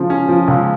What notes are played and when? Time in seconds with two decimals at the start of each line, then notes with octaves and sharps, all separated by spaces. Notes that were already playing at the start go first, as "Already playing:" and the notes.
Already playing: C#3 F3
0.10 C#4
0.28 F3
0.48 C#2